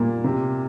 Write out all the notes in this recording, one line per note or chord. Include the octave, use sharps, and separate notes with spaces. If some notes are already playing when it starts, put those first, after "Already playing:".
Already playing: A#2 G3 A#3
C3